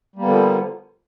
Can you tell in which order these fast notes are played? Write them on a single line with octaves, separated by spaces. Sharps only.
G3 A#3 B3 D3 F3